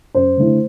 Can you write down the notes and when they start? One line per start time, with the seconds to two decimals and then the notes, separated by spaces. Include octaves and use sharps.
0.15 F#2 C5
0.37 D3 A3 E4